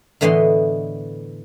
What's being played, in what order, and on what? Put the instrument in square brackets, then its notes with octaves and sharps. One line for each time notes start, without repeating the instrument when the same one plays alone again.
[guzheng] A2 D3 E3 B3 D#5 C6